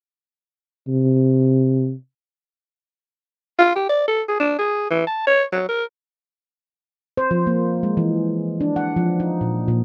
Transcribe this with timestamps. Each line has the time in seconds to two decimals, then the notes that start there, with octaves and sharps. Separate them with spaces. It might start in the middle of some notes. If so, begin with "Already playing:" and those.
0.88 C3
3.59 F4
3.76 G4
3.89 D5
4.08 A4
4.28 G#4
4.40 D4
4.59 G#4
4.91 E3
5.07 A5
5.27 C#5
5.53 F#3
5.69 A#4
7.17 C5
7.31 F3
7.47 A#3
7.83 G#3
7.97 E3
8.61 D4
8.76 F#5
8.96 F3
9.20 D#4
9.41 A#2
9.68 A#2